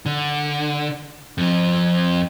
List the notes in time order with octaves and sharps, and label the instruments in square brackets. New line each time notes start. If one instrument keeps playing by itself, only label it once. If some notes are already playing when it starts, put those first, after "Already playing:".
[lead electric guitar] D3
F2 F3